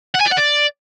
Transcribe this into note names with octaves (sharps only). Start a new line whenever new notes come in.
F#5
G#5
D5
F#5
D5